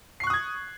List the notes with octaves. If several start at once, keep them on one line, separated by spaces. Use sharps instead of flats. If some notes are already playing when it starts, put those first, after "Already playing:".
C#6 D#6 F#6 G#6 C7